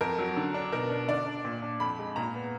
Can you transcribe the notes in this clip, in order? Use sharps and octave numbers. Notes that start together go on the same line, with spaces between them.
F2 A#4
F#3
D3
D4
B2 A#4
D4
D3 D5
D4
A#2
D4
F2 B5
G#3
A#2 A#5
B3